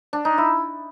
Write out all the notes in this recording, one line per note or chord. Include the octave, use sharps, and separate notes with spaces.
D4
D#4
E4